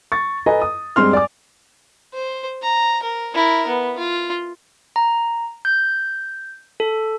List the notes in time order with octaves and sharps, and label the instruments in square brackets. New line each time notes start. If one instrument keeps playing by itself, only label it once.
[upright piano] C#6 A6
A4 B4 D#5 G#5 A#5
D#6
G2 G#3 C4 C6 F6
D5 G#5 D6
[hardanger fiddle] C5
A#5
A#4
E4 A#4
B3
F4
[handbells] A#5
G6
A4